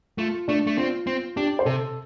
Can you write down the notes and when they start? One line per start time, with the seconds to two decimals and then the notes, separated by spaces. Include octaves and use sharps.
0.18 A3 F4
0.48 A3 D4
0.67 A3
0.78 C4 F4
1.07 C4
1.37 D4 G4
1.59 C5
1.66 C3 A4